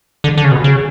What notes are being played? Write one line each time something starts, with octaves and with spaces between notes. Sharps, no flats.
D3
D3
C#3
B2
C#3